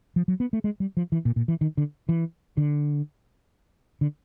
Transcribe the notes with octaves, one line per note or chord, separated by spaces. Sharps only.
F3
F#3
B3
A3
G#3
G3
F3
E3
A#2
A#2
E3
D#3
D3
E3
D3
D3